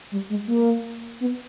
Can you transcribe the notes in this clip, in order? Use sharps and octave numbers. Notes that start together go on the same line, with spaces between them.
G3
G#3
A#3
B3